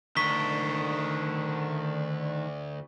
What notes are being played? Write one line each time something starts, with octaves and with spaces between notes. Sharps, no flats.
D2 D#3 D4 C#6 B6 G7